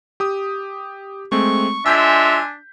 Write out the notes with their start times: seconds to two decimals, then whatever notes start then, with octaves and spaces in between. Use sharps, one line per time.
0.20 G4 D#6
1.32 G#3 A3 C4 C#6
1.86 G#3 D4 F4 E5 G#5 E6 G6 B6